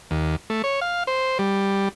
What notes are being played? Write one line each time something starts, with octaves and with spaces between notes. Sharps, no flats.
D#2
A3
C#5
F5
C5
G3